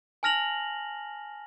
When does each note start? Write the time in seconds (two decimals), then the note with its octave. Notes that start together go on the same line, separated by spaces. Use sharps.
0.23 G#5 A5 F6 A#6 F7 F#7